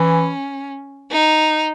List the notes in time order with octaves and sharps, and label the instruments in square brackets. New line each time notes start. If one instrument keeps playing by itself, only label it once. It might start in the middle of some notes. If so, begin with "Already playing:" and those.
Already playing: [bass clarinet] E3 [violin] C#4
[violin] D#4